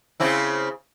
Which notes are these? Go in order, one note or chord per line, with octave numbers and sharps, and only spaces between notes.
C#3 C4 E4